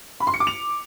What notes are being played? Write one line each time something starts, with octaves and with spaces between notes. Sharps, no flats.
B5
C6
C#7
D6
F7